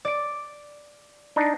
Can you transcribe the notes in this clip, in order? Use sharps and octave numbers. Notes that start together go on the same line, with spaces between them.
D5 D7
D4 D#4